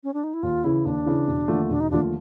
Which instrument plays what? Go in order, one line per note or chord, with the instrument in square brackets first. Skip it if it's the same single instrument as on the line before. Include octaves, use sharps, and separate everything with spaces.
[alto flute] C#4
D4
D#4
E4
[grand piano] D#2 [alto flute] F4
[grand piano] C#3 E3 [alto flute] E4
[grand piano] D#2 [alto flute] D4
[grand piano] C#3 E3
E1
D#2 D3 F3 A3
[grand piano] E1 [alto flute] D4
[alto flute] D#4
[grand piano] D#2 D3 F3 A3 [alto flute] D4